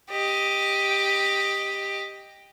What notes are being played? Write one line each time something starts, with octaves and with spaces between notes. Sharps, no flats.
G4 D#5